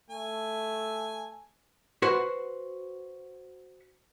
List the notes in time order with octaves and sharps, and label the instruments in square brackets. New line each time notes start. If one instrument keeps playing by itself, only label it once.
[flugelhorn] A3 [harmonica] G#5
[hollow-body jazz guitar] F#4 B4 C5 F#5